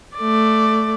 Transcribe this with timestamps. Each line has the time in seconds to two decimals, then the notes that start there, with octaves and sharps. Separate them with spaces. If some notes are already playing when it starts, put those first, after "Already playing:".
0.17 A3 D5